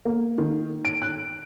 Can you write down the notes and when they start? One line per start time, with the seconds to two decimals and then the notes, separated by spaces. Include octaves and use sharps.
0.05 A#3
0.38 D#3
0.85 D7
1.02 F#6